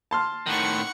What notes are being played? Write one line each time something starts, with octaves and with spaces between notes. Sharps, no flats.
A5 C6 F6
A2 D#3 F#5 C#6